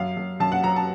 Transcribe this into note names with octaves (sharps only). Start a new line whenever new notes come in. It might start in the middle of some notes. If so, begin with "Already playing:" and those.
Already playing: F#2 F5
F#2
F#2 A5
F#5
F#3 A#5
A5